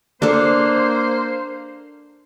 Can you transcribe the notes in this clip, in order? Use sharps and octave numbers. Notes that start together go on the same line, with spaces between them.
A#3 D4 A4 C5